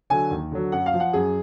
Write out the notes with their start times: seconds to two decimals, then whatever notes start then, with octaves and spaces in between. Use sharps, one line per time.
0.10 D3 F#3 G#5
0.31 D#2
0.52 D3 F#3
0.72 F#2 F#5
0.86 F5
0.93 F3
1.00 F#5
1.13 F#2 G#4